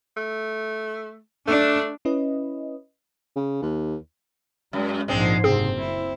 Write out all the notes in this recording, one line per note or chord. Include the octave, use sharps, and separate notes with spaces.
A3
A3 D4
C#4 E4 B4 D#5
C#3
D#2
F#2 G#3
A#1 G#2 F3 G#3 C4 D4
F#1 C3 C4 G#4
E4